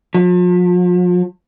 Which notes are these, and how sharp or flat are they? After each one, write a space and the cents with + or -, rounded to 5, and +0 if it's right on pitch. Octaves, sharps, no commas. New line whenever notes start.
F3 +40